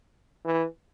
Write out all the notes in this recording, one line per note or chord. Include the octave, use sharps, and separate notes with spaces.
E3